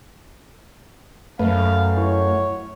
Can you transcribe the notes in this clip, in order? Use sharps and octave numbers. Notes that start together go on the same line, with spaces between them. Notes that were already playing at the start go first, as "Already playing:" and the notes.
F#2 A3 B4 F5
E4 C#5